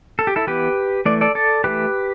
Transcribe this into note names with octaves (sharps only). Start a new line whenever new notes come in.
A4
G4
E4 A4
E3 B3 G4 B4
E3 A3 D5
A4 D5
A4 D5
E3 A3 G4 B4